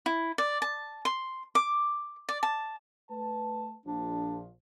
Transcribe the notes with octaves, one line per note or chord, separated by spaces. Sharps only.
E4
D5
A5
C6
D6
D5
A5
A3 B4 A5
A#1 F3 D4